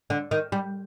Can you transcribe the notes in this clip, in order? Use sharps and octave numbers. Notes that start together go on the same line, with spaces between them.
D3
D#3
G3